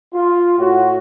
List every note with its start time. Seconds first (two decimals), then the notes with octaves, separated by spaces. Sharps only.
0.13 F4
0.60 A2 F#4